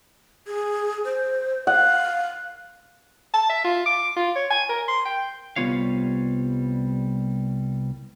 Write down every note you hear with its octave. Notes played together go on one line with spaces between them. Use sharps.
G#4
C5
F5 F#5
A5
E5
F4
D6
F4
C#5
G#5
A#4
C6
G5
C2 G3 B3 F4 C#5 F5